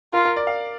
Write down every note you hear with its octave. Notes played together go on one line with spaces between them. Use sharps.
F4 A#4
A#4
D5
F5